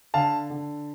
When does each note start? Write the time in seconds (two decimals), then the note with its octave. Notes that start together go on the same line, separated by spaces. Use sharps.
0.14 D3 F5 A5
0.50 D3